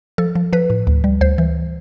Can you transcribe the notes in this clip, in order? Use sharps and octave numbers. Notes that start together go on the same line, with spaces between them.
F3 A4
F3
F3 B4
A2
D2
G3
D2 C5
E3